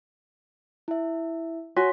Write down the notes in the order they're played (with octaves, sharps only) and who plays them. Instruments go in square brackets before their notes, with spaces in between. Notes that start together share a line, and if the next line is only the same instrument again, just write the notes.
[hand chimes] E4 E5
[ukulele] F#4 G#5 [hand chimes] C#5 C6 B6